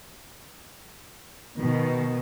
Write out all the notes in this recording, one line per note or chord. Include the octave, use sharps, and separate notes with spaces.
B2 D#3